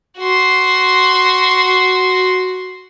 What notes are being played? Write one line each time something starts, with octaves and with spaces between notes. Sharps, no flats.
F#4 C6